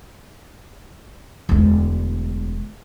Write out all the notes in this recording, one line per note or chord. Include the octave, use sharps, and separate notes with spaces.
E1 D2